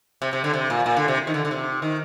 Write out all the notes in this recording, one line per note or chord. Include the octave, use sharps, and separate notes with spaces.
C3
C3
D3
C3
A#2
A#2
D3
C3
D#3
D3
D3
C3
D#3